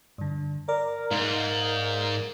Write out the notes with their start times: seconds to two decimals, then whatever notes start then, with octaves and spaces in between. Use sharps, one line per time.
0.18 G2 D3
0.68 A#4 D5
1.11 G#2 A#3